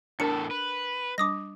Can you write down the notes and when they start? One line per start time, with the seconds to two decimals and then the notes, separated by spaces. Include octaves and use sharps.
0.20 E2 A2 D4 A4 A#4 C#7
0.51 B4
1.18 G3 D4 D6 D#6 A#6